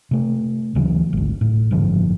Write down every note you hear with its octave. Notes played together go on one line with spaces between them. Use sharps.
C3 A3
D2 C#3 E3 F#3
G#1 D2
A2
F#1 G#2 D3 F3